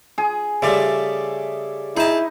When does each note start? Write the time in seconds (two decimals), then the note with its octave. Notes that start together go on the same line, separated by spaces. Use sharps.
0.18 G#4
0.62 C#3 G3 A3 D5 E5
1.97 D#4 E4 G#4 A5